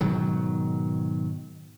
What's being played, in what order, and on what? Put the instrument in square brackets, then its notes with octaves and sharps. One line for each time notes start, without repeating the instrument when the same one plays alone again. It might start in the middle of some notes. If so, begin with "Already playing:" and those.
[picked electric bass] G#2 B2 D#3 F#3